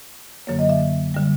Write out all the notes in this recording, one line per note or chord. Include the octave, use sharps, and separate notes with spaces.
F#2 D3 F#3 A#3 C#5
D#5
E5
D3 G3